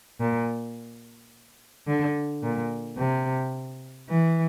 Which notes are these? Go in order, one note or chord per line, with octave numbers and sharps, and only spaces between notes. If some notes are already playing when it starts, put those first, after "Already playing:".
A#2
D3
A#2
C3
E3